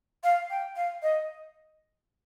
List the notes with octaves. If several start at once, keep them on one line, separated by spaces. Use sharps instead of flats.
F5
G5
F5
D#5